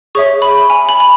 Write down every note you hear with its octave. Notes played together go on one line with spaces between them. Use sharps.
G#4 C#5 E5 C#6
B5
G#5
B5
B5